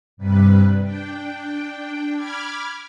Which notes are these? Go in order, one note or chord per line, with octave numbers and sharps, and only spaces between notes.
G2 C3 G3 B4
D4 G5
B5 D6 F6 G#6